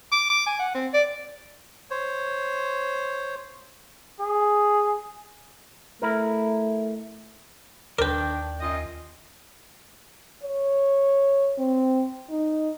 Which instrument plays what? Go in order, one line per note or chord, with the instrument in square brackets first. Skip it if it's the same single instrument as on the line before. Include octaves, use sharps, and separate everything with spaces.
[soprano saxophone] D6
D6
G#5
F#5
C4
D5
[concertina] C5 C#5
[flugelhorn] G#4
[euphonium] A3 [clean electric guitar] E4 A#4
[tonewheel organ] D#2 [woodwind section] D#3 D4 [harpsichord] A#4 B4 [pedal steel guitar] D5 G5
[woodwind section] F#2 F4 D#5
[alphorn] C#5
C4
D#4